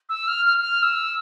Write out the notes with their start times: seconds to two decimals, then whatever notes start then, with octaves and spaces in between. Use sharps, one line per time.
0.09 E6
0.28 F6
0.46 F6
0.61 F6
0.83 E6